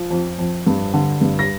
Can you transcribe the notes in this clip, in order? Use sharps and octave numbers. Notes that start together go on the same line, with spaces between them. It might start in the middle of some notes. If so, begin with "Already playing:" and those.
Already playing: F3
F2
F2
G2
D3
G2
A#6